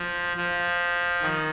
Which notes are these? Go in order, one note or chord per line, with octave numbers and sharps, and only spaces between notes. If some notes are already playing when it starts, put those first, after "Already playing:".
Already playing: F3
F3
D#3